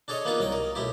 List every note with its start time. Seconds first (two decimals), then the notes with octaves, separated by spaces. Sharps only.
0.08 D4 G#4 A4 C#5 D#5
0.25 A#3 B3 D#4 F4 G#4
0.39 C2 F#3 D#5 G5
0.52 A#4
0.75 B1 A3 E4 G4